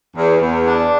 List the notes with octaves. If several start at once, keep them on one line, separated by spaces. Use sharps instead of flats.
E2
E2
D4